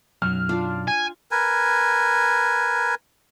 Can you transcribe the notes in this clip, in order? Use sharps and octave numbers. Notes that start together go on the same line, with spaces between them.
B1 F#2 F#3 F6
D4 F4 D5
G#5
A#4 B4 G#5